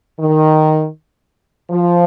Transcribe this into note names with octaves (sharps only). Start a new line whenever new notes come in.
D#3
F3